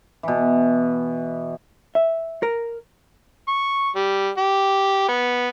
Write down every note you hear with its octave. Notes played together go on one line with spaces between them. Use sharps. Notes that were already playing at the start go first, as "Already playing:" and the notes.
B2 E3
E5
A#4
C#6
G3
G4
B3